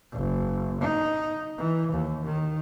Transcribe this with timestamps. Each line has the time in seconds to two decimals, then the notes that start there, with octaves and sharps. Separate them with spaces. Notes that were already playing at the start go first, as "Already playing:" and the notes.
0.13 F#1
0.81 D#4
1.58 E3
1.92 D#2
2.26 D#3